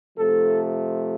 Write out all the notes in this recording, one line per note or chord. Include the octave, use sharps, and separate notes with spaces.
C3 F3 A3 A4